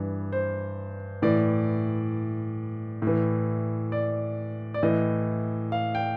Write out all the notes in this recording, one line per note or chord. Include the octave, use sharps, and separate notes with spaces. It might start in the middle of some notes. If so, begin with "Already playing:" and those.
Already playing: G2 E3
C5
A2 E3 D5
A2 E3
D5
D5
A2 E3 D#5
F5
G5